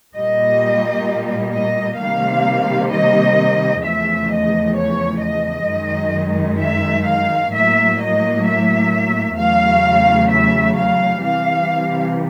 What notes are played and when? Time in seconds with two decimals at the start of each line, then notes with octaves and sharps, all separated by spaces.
0.15 A#2 G3 A#3 D#5
1.54 D#5
2.00 C3 D#3 G3 A#3 F5
2.92 D#5
3.84 E2 C#3 F3 A3 E5
4.30 D#5
4.76 C#5
5.22 D#5
5.69 F#2 D#3 G#3
6.61 E5
7.07 F5
7.53 A2 F#3 A#3 E5
8.00 D#5
8.46 E5
9.38 E2 C#3 F#3 A3 F5
10.31 E5
10.76 F5
11.23 C3 E3 G3 F5